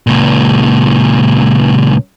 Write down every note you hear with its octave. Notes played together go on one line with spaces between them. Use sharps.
C#2 A#2